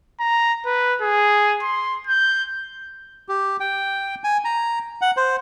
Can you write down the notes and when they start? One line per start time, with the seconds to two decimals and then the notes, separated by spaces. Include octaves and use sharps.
0.20 A#5
0.66 B4
1.02 G#4
1.62 C6
2.07 G6
3.29 G4
3.60 G5
4.24 G#5
4.45 A#5
5.01 F#5
5.17 C5